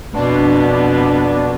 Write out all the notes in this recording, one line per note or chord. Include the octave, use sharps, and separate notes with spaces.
F2 B2 B3 D4